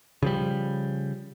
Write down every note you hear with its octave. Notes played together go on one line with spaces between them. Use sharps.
C#3 F3 G3